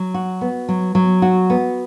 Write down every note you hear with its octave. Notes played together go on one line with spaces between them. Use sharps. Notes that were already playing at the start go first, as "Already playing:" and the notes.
Already playing: F#3
F#4
B3
F#3
F#3
F#4
B3